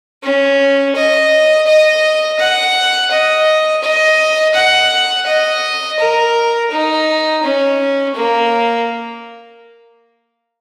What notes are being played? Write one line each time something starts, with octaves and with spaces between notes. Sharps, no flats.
C#4
D#5
D#5
F#5
D#5
D#5
F#5
D#5
A#4
D#4
C#4
A#3